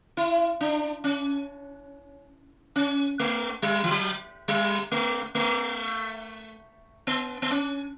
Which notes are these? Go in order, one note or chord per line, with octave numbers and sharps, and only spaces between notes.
E4
D4
C#4
C#4
A3
G3
E3
F#3
G3
A3
A3
B3
B3
C#4